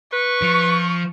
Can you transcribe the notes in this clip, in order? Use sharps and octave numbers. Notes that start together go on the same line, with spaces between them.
B4 C#6
F3